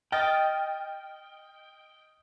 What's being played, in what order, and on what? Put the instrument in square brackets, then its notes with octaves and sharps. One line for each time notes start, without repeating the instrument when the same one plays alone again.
[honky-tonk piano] D#5 F6 A6 [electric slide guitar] G5